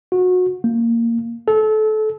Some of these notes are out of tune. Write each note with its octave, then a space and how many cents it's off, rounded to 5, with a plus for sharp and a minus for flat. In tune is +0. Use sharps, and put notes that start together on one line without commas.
F#4 -25
A#3 -10
A4 -25